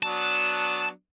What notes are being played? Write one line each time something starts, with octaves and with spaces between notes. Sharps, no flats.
F#3 B3 D4 A5